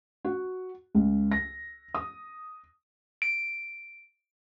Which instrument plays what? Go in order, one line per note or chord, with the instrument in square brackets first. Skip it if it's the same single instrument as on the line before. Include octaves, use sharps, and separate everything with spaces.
[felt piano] F#4
C#2
A#6
D#6
[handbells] D7